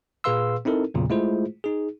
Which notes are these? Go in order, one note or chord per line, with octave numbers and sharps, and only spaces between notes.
A#2 G#4 B4 F5 C6 E6
C4 D#4 E4 A4 A#4
E2 A#2 C#3 F#3
G#3 A3 E4 F4 G#4 C5
D#4 G#4